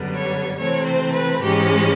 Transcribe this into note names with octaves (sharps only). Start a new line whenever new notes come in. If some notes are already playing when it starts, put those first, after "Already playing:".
Already playing: F#2 D3 G3 B3
C#5
C3 E3 A3 C4 C#5
C5
B4
G#2 E3 G#3 C#4 G4